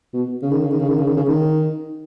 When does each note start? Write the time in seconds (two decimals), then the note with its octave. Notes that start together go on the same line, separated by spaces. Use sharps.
0.13 B2
0.42 C#3
0.51 D#3
0.61 C#3
0.70 D#3
0.79 C#3
0.88 D#3
0.98 C#3
1.07 D#3
1.17 C#3
1.28 D#3